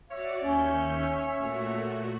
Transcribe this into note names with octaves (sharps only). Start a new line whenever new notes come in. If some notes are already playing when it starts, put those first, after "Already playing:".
F#4 C#5 D5 E5
D#2 C#4 G6
A#2 A3 F#4